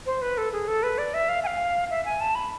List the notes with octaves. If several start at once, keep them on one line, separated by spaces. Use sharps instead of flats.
C5
B4
A4
G#4
A4
B4
D5
E5
F5
G#5
F5
E5
G#5
A5
B5